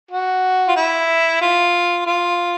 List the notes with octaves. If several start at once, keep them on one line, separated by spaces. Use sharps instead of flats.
F#4
F4
E4
F4
F4